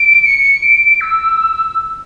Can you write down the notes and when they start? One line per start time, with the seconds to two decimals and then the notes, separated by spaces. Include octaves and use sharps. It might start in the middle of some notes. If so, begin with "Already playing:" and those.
Already playing: D7
0.25 C#7
0.63 D7
1.01 E6